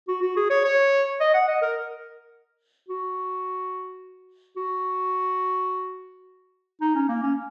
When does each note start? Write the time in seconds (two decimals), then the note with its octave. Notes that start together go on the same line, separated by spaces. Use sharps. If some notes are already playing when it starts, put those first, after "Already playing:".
0.08 F#4
0.22 F#4
0.37 G#4
0.50 C#5
0.64 C#5
1.20 D#5
1.34 F#5
1.48 D#5
1.62 A#4
2.89 F#4
4.57 F#4
6.81 D#4
6.95 C#4
7.09 A#3
7.23 C#4